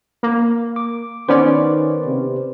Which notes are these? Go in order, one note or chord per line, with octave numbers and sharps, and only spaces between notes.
A#3
D6
D#3 B3 C#4 B4 C5 D5
C3